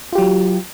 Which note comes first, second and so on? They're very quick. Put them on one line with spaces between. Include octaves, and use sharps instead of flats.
F4 G4 F#3